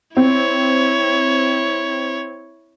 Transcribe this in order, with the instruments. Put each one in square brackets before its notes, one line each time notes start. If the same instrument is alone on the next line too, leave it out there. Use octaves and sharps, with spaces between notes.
[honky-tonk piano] C4 [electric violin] E4 C#5